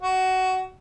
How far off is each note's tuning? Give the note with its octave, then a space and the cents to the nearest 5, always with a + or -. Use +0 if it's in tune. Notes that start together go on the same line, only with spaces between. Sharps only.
F#4 +15